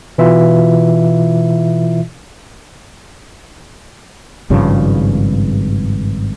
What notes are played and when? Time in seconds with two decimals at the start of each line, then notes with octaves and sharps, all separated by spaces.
0.18 B2 E3 E4 F4 E5
4.50 G#1 G2 C#3 F3